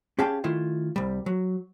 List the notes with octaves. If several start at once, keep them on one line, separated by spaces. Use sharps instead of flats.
C#4 G4 G#4 F5 G5 A5
D#3 A3 E4 F4
C2 G3
F#3